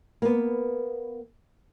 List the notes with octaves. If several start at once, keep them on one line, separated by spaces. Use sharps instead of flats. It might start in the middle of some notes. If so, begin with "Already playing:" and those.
A#3 B3